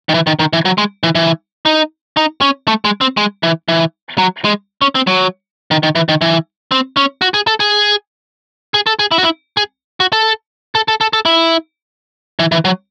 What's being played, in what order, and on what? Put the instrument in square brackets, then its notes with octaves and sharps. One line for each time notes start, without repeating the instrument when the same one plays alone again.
[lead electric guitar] D#3
E3
D#3
D#3
E3
F#3
G#3
E3
E3
D#4
D#4
C#4
A3
G#3
C4
G#3
E3
E3
F#3
G#3
C#4
C4
F#3
D#3
D#3
E3
D#3
E3
C4
C#4
F#4
G#4
A4
G#4
G#4
A4
G#4
E4
F#4
E4
G#4
F#4
A4
A4
A4
A4
A4
E4
E3
E3
F#3